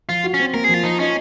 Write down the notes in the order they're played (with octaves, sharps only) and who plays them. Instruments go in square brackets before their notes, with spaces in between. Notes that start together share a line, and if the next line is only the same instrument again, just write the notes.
[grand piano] F3 [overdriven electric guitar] F4
[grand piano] F#4
[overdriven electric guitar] C#4
[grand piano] C4
[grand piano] A#3 [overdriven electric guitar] A#4
[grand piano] F3 [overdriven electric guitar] G#4
[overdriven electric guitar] F4
[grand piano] F3 [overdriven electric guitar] D#4
[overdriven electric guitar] C#4 [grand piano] D#4